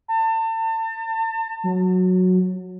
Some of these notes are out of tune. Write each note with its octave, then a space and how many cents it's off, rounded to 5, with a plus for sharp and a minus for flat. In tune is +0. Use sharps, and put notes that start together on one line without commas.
A5 +35
F#3 -10